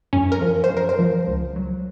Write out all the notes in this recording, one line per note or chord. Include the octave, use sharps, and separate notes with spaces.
F#2 C#4
A#4
F3
C5
F#2
A#4
C5
F3
C#2
F#3